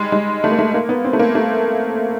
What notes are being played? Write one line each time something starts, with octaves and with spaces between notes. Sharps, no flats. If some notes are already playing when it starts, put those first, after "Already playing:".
Already playing: G3 G#3
G#3
A3
A#3
A3
A#3
B3
C4
A3
A#3
A3